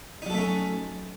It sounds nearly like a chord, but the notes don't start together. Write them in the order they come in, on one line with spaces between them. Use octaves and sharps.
D#4 F#3 A4 A3 C#4